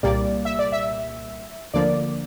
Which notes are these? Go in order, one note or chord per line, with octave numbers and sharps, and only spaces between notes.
C2 A#2 G3 A#3 D5
E5
D5
E5
D2 D3 F3 A#3 D5